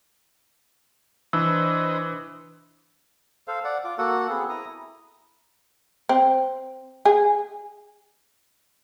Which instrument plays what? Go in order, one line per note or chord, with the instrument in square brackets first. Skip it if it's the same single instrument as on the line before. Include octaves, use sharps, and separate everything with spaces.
[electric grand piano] E3 [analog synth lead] D4 [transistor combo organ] B4 C5 D#5 [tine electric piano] E6
[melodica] A4 C5 F5
D5 F#5
F4 D6
A#3 F#4 A4 F#5
B3 C4 G#4 A4
E4 A#5 D#6
[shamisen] C4
G#4